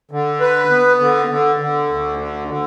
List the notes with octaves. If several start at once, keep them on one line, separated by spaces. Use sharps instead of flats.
D3
B4
B3
D3
D3
D3
D2
D3
D3